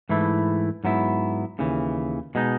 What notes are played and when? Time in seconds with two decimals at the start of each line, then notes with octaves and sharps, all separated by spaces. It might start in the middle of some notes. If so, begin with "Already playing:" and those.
0.09 G#2 E3 A3 E4
0.84 G#2 F#3 B3 E4
1.59 D#2 C#3 E3
2.35 B2 G#3 D#4